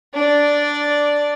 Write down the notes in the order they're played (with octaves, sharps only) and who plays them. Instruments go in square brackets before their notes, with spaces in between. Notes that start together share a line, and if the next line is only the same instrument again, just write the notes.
[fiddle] D4 D5